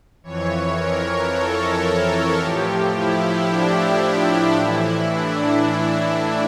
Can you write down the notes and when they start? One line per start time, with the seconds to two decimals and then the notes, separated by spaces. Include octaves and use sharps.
0.24 F2 E3 C#5
0.77 A#4
1.32 A4
2.40 A2 F3 G4
2.94 E4
3.49 D4
4.02 D4
4.56 A2 E3 E4
5.10 D4